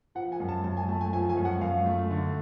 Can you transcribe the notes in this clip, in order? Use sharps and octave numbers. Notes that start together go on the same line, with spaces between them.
F3 F#5
G#5
F#2
A5
F#2 A5
G#5
A3 A5
G#5
F3 G#5
G#5
F#2
F#5
F#2 F5
A3
D3